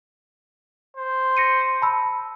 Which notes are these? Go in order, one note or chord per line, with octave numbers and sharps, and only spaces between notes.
C5
A#6 C#7 D#7
A5 B5 E6